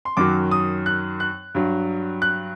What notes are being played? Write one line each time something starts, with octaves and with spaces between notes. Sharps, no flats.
C6
F#2 D#3 F#3 D6
D#6
F#6
F#6
G2 F#3
F#6